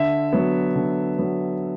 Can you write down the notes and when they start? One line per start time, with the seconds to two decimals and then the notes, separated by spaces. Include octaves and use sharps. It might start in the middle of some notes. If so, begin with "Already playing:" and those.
Already playing: D3 E5
0.33 F#3 B3
0.76 D3
1.19 F#3 B3